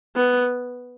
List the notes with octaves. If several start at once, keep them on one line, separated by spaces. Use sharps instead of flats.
B3